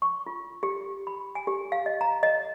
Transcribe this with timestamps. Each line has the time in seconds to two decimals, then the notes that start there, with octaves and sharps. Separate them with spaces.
0.02 C#6
0.26 F4
0.63 G4
1.07 B5
1.35 G#5
1.47 G4
1.72 F5
1.86 D#5
2.01 A#5
2.23 D#5